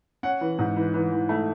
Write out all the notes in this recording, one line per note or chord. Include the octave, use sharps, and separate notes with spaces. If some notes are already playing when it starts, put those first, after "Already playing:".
C#4 F#5
E3
G#2
E3
E3
E3
A3